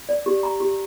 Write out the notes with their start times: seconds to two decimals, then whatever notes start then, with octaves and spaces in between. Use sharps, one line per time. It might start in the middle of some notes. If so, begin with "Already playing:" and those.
0.09 D5
0.26 G4
0.43 A#5
0.60 G4